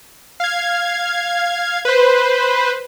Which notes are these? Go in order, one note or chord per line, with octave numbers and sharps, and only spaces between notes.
F5 G#6
B4 C5